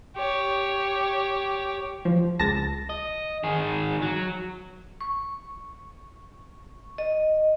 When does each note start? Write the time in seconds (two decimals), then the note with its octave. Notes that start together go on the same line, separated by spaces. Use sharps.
0.16 G4 C#5
2.05 F3
2.39 C#2 A5 A#6
2.90 D#5
3.44 D#3 G#4
4.02 F#3
5.01 C#6
6.98 D#5